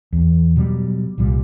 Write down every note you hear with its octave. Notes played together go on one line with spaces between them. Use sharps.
E2
B2 F#3 G3
C2 A#2 G3